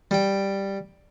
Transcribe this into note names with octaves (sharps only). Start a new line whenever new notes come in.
G3 G5